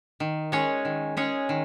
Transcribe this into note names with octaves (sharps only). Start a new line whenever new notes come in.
D#3
G#3 C#4 G#4 C#5
D#3
G#3 C#4 G#4 C#5
D#3